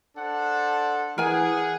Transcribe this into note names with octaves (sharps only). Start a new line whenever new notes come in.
D4 A4 C5 F#5
E3 G#4 A#4 F#5 G#5